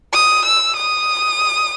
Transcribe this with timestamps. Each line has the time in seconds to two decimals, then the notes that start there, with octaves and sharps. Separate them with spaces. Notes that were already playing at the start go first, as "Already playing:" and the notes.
0.14 D#6
0.46 E6
0.76 D#6